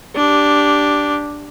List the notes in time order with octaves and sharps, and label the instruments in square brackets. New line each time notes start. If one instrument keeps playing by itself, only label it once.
[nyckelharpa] D4 G4